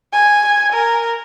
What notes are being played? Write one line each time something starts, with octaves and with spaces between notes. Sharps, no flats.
G#5
A#4